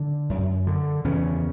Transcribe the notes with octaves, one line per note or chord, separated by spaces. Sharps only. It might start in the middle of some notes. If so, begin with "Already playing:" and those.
Already playing: D3
F#2
D3
E2 C#3 C#4